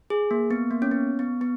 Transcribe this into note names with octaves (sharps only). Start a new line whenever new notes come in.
G#4
A#3
B3
A#3
C#4
B3
B3
B3